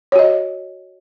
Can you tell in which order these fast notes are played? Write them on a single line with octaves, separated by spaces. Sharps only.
C#5 F#4 D#5